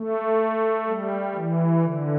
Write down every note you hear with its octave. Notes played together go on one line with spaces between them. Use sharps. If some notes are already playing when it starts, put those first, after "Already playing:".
Already playing: A3
G3
E3
D3